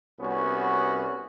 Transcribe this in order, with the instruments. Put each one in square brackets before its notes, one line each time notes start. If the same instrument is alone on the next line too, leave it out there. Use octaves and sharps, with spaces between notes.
[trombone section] C2 B3 C#4 F#4